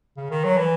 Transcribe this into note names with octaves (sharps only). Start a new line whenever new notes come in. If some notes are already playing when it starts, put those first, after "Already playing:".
C#3
D#3
F#3
E3